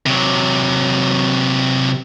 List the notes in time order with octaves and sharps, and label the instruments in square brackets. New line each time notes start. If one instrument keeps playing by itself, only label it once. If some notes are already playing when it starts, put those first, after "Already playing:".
[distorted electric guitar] C3 F#3